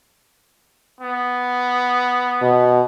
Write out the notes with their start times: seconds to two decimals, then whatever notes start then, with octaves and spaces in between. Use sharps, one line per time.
1.01 B3
2.42 B2